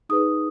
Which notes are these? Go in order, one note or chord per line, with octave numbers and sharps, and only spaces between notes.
D#4 G#4 B4 D#6